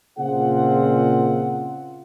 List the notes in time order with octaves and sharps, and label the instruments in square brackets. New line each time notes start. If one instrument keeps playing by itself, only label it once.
[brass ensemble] A#2 C#3 C4 F4 G#4 F#5